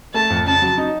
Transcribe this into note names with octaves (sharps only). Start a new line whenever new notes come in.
A3 A5
F2
C#3 A5
F#3
D#4